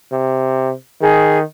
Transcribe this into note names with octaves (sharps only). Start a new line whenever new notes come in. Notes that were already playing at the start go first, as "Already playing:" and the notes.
C3
D#3 G#4